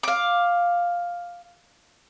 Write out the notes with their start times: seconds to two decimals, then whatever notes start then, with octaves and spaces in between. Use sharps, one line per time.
0.03 F5 D6